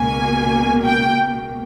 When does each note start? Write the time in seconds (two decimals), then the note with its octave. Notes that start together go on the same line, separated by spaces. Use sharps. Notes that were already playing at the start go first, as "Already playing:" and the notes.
Already playing: C#2 B2 A#3 G#5
0.84 G5